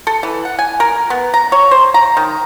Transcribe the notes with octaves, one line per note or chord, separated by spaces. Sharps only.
A4
E3
F#5
G#5
A#4
B3
A#5
C#5
C5
A#5
D#3